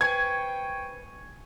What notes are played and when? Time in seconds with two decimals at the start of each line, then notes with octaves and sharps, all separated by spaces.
0.01 B4 C5 G5 G#5 C#6 G#6